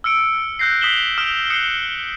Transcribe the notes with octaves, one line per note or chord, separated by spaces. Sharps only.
E6 F6 C#7 D7
E6 F#6 G6 A#6 C7
D#6 B6 C7 E7 F#7 G7
D#6 F6 D7 E7
D#6 F6 F#6 C7 C#7 E7